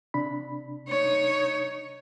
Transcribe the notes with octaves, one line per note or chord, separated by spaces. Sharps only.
C3 D4 B5
D#4 C#5